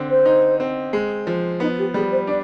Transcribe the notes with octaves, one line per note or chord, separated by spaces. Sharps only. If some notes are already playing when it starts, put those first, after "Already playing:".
Already playing: D3 C4
C5
D#4
C4
G#3
F3
B3 D#4
G4
G3 G#4
C5
D4 D5